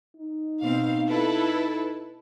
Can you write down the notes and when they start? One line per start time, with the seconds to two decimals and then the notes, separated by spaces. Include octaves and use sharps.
0.16 D#4
0.62 B2 C4 F5
1.07 E4 A4 B4